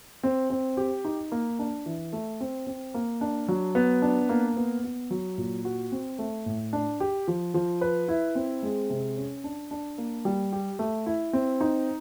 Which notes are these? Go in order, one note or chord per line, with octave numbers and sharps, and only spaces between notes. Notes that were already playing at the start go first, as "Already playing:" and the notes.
C4
C4
G4
D#4
A#3
D4
E3
A3
C4
C4
A#3
D4
F#3
B3
D4
A#3
B3
B3
F#3
A#2
F#4
C4
A3
A2
D4
G4
F3
F3
B4
E4
C4
G#3
C3
C#4
D4
D4
A#3
G3
G4
A3
E4
C4
D#4